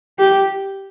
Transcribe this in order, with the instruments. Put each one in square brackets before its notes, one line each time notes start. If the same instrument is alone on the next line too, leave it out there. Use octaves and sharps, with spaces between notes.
[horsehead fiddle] G4